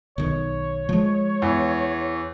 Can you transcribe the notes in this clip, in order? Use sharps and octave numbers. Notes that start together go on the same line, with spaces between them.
B1 D#3 C#5
F3 G#3
E2